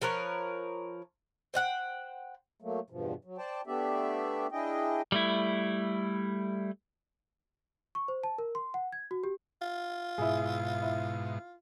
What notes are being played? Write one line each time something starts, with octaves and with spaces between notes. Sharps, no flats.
F3 A#4 B4 C#5
C5 D#5 F#5 G5
F#3 A3 A#3
E2 G2 B2 F3
F#3
C5 D5 G5 A5
A3 B3 D4 G4 D5 E5
D4 E4 G#4 D#5 G5
G3 A3 E4
C#6
C5
A5
A#4
C6
F#5
G#6
F#4
G4
F4
G#2 B2 E4 G#4
E4